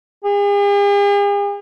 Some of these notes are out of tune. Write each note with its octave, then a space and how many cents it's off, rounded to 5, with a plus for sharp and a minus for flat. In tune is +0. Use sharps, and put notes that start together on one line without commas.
G#4 -45